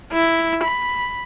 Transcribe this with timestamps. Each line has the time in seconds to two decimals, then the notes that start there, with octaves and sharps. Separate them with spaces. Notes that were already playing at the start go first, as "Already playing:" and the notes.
0.12 E4
0.64 B5